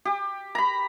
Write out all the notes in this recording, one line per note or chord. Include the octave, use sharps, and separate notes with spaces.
G4
A#5 B5